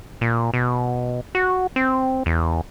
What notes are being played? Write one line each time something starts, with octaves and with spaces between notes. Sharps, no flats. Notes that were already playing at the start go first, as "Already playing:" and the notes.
A#2
B2
F#4
C4
E2